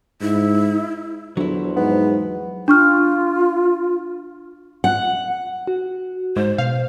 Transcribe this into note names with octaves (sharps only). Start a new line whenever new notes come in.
G#2 E4
E2 D3 F3 F#3 E4 C5
G#2 B3
D4 F4 C#6 F6
F#5
F#4
G#2 C5
B2 F5